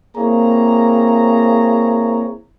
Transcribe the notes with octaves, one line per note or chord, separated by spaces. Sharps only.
A#3 C4 E4 G#4 C#5 A#5